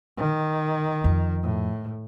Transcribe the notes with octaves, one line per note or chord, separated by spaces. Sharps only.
D#3
F2
A2